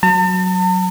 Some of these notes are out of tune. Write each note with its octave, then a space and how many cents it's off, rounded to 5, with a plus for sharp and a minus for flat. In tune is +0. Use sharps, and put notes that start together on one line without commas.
F#3 +0 A5 +45